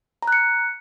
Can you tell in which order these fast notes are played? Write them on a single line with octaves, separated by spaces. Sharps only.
A#5 F#6 C#7